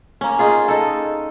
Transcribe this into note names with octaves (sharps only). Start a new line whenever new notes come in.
A#3 C#4
D#4 F4 G#4
D#4 A4